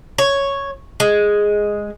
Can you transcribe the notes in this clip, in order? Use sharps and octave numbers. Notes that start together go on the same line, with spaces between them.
C#5
G#3